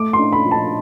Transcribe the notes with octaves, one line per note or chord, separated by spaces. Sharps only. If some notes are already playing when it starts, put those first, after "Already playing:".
Already playing: A3 D6
C6
D4
B5
F3
A5